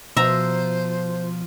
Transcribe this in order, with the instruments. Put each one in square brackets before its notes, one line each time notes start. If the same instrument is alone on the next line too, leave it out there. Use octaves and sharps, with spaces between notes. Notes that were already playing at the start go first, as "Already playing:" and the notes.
[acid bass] B2 [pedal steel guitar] F3 [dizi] C5 [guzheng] E5 A#5